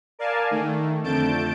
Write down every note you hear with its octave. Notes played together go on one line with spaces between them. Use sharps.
A#4 D5 F5 G#5 A5
D#3 A3
F2 D3 A3 A5 G6 D7